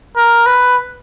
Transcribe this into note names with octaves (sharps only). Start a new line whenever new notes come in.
A#4
B4